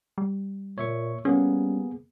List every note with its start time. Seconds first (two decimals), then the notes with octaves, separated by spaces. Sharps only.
0.18 G3
0.78 A#2 C#5 E5 C#6
1.25 G3 A#3 B3 C#4 G#4